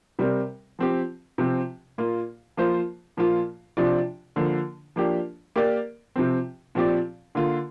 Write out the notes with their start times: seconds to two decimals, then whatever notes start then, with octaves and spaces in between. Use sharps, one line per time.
0.19 C3 G3 C4 A#4
0.79 F3 C4 G4
1.38 C3 F3 C4
1.98 A#2 A#3 F4
2.57 F3 A#3 F4 C5
3.17 A#2 F3 A#3 F4
3.77 C3 F3 D4 F4 D5
4.36 D3 F3 A#3
4.96 F3 A#3 D4 G4
5.56 A#3 G4 A#4 D5
6.16 C3 F3 C4
6.75 A#2 F3 C4 G4 D5
7.35 D3 A#3 F4